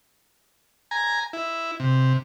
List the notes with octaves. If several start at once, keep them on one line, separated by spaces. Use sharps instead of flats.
G#5 A#5
E4
C3